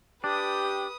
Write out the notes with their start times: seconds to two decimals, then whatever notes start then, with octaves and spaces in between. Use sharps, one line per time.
0.24 D4 G4 B4 D#6